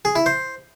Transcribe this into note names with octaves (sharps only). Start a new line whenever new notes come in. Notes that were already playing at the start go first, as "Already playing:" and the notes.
G#4
E4
C5